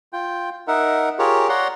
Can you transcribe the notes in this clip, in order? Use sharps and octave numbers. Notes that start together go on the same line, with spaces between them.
F4 G5
D#4 A#4 E5 F#5
F4 G4 G#4 A#4 C#5
C#5 D5 F#5 A#5 C6